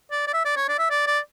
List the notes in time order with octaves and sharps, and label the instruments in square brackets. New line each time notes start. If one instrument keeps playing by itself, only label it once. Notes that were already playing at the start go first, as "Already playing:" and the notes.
[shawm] D5
D5
E5
D5
C#5
D5
E5
D5
D5